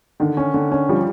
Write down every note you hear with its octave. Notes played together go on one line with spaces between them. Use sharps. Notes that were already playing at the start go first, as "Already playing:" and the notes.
D3 D#3
C#4
D3
C#4
F3 G3